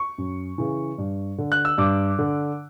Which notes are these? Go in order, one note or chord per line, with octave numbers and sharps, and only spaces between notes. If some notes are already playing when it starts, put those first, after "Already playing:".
Already playing: C#6
F#2
C#3 E3
G2
D3
F#6
E6
G2 D6
D3